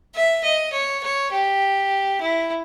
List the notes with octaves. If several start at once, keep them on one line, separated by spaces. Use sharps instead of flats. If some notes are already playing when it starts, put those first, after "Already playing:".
E5
D#5
C#5
C#5
G4
E4